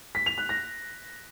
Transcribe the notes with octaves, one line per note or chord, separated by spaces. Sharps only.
B6
F7
F#6
A#6